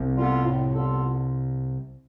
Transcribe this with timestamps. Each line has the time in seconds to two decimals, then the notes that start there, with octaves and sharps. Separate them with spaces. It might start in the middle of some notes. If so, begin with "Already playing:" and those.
Already playing: C2 C3
0.16 G3 B3 F4 A4
0.45 A2
0.74 G3 B3 F4 A4